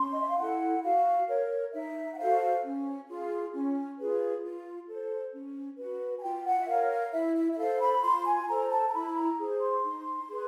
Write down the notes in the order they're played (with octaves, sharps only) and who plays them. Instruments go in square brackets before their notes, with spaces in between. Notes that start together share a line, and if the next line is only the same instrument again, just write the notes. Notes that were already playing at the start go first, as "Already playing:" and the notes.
Already playing: [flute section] C#4 C6
D#5
E5
F5
E4 A4 F#5
F#4 F5
A#4 C#5
D#4 E5
F#5
F#4 A4 C5 F5
C#4
F4 G#4
C#4
F4 G#4 B4
F4
A4 C5
C#4
F#4 B4
G#5
F4 G5
F#5
E5
A#4 C#5 F5
F5
E4 E5
E5
E5
A4 C5 F5
B5
F4 C6
G#5
A4 C5 A#5
A5
A#5
E4 B5
A#5
G#4 C5
C6
D#4
G#4 B4